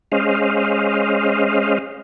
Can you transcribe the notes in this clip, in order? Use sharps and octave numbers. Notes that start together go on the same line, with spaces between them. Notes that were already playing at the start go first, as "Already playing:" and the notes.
G#3 C#4 C5 D#5 F5